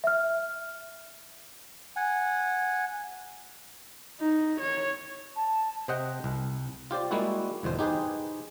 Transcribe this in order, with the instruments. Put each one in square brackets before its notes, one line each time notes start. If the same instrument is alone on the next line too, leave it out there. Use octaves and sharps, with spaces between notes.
[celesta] E5 F6
[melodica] F#5 G#5
[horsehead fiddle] D#4
C#5
[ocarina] A5
[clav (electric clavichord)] C3 C5 D#5 F#5 G5
C2
F4 G4 C5 D5
G3 G#3 A#3 E4 F#4
G1 E2 B2 C5
D#4 G4 G#4 B4 C5